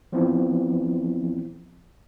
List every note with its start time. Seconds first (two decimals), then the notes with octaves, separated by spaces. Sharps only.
0.12 E3 F3 B3 C4 E4